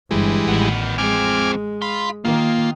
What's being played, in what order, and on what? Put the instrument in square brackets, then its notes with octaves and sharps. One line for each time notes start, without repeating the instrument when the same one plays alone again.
[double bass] G1 [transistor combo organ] E3 G3 G#3
[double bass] A1 [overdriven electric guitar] D#3 B3
[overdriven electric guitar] F3 C4 [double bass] G#3 [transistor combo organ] G#5 D6 F6
[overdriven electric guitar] F5 C6 [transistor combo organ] B5
[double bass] D#3 [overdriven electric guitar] A#3 [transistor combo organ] F4